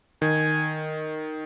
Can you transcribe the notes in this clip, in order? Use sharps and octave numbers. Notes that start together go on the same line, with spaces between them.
D#3 G#5